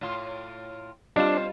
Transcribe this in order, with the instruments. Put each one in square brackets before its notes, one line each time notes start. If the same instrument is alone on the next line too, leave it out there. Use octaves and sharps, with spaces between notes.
[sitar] A2 F4
[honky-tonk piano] G3 F4 E7 [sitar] C4 C5 C#5 [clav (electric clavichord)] D4 [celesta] D#5